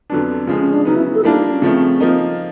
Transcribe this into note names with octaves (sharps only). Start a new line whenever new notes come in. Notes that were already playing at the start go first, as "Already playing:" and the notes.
F2 D3 F#3 B3 D4
C#3 F3 G#3
C#4
D4
C#3 F#3 B3 D#4
E4
A4
G3 A#3 D4 E4 F4
D#4
D4
C#4
C#3 F3 A3 C4
F3 A#3 D#4